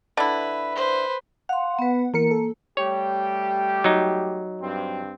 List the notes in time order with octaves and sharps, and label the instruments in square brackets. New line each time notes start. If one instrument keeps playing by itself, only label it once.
[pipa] D3 E4 [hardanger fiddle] B4
[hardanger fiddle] B4 C5
[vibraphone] F5 C6 [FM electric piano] F#5
[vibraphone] B3 B4
[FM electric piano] E3 A#4 C#7 [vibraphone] A#3
[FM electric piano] A4
[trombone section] G3 A3 G4 [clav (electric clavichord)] C#5
[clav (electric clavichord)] F#3 D#4
[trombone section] G2 C4